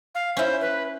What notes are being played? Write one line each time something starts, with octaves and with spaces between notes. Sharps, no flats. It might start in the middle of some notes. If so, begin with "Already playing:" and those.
F5
C#4 E4 C5
B4